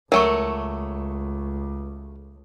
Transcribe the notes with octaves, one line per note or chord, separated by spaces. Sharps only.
C#2 F#3 A3 A#4 C#6